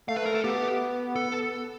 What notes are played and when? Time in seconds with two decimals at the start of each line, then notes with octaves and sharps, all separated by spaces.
0.08 A3 F5
0.17 B4
0.26 A#4
0.35 A4
0.44 B3 G4
1.16 A4